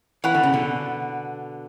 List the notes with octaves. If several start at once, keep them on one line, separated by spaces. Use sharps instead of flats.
E3 C#5 F#5 B5
D3
C#3
B2 D3